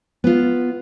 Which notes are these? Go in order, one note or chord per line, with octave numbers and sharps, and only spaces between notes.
B3 F4